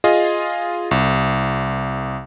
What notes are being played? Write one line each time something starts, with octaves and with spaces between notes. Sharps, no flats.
F4 G#4 D#5 F5
C2